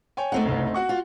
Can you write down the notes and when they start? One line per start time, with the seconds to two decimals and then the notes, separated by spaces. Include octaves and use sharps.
0.17 C#5 G5 G#5
0.32 A3 C4 D#4 F#5
0.45 F#1 C2
0.74 F#4 F#5 C#6
0.89 F4